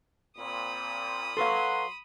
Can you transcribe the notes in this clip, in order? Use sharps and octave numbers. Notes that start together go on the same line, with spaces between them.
A#2 C4 B5 D#6
F#3 A4 B4 F5 C6